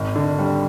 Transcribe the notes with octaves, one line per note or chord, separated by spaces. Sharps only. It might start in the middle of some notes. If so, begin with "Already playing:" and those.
Already playing: G#1
D3
G3